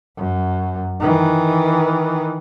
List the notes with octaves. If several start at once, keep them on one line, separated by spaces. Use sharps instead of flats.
F#2
D#3 E3